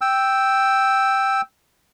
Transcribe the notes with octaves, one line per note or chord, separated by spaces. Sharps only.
G5 E6